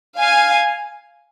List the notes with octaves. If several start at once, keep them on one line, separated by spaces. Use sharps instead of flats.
F5 G#5